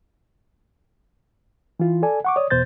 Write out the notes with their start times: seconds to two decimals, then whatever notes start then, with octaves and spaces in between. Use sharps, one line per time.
1.80 E3 F4
2.03 A4 D5 G#5
2.25 F#5 C#6 D6
2.36 C#5 D5 D#6
2.50 E2 B2 C5 G6 A6